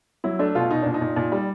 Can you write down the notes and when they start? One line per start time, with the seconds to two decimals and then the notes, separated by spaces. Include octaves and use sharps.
0.24 F#3 E4
0.39 A3 D4
0.55 B2 F4
0.70 B2 D#4
0.82 A#2 D4
0.94 D#4
1.01 A#2
1.16 A#2
1.32 G3